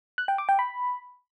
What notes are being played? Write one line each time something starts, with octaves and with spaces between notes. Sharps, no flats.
F#6
G5
D6
G5
B5